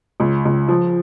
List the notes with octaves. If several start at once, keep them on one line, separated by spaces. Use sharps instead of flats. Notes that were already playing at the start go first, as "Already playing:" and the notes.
C#2
C#2
F3